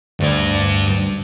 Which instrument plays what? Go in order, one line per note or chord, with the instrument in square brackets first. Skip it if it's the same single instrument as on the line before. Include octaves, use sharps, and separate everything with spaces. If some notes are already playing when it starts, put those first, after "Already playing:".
[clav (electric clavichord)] D2 [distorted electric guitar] G2 D5